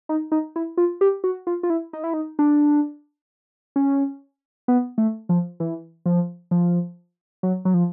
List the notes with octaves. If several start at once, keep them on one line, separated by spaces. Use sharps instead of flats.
D#4
D#4
E4
F4
G4
F#4
F4
F4
E4
D#4
E4
D#4
D4
C#4
B3
A3
F3
E3
F3
F3
F#3
F#3
F3